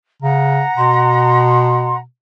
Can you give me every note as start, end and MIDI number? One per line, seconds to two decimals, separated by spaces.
0.22 0.63 49
0.22 1.96 78
0.22 1.96 82
0.77 2.04 47
0.77 1.94 84